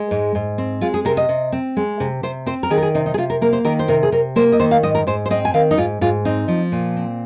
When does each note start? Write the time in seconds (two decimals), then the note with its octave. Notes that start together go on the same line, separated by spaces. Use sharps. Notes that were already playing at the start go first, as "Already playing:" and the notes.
Already playing: G#3
0.11 G#2
0.35 G#2
0.58 C4
0.81 G#3 F4
0.94 G#4
1.05 C3 A#4
1.17 D#5
1.29 C3
1.52 C4
1.77 G#3
2.00 C3
2.23 C3 C5
2.46 C4 C5
2.63 A#4
2.70 D#3 G#4
2.78 A#4
2.82 G#4
2.95 C3 D#4
3.06 D#4
3.14 G#4
3.18 C3 F4
3.30 A#4
3.41 A#3 A#4
3.53 C5
3.65 D#3 A#4
3.79 C5
3.88 C3 A#4
4.03 G#4
4.12 C3 A#4
4.36 A#3 C5
4.52 D#5
4.60 D#3 C5
4.71 F5
4.83 G#2 D#5
4.95 A#4
5.07 G#2 C5
5.26 C5
5.30 C4 D#5
5.45 G#5
5.54 D#3 F5
5.71 D#4
5.78 G#2 F4
6.01 G#2 F4
6.25 C4 D#4
6.48 F3
6.72 A#2
6.96 C4